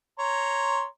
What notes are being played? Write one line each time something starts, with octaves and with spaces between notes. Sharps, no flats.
C#5 A#5 C6